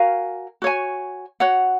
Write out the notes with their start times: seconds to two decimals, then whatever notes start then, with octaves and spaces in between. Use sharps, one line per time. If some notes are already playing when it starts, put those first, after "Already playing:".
Already playing: F#4 A#4 F5 G#5
0.62 F#4 C#5 G#5
1.40 F#4 C#5 F#5